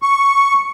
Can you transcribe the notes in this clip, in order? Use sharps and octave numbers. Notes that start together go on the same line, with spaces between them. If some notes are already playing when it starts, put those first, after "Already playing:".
C#6